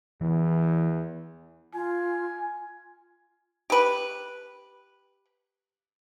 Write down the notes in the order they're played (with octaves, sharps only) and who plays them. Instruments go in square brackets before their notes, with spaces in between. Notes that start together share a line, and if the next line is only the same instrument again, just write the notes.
[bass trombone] E2 [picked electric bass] E3
[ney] F4 [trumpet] G#5
[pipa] G4 B4